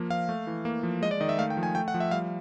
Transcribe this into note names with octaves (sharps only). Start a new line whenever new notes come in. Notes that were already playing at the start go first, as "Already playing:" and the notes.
Already playing: F3 A#3
F3 F5
A3
E3
A#3
F3
G#3 D#5
D5
D#3 D#5
E5
A3 F5
G5
F3
G#5
A3 G5
F#5
F3
E5
G3 F5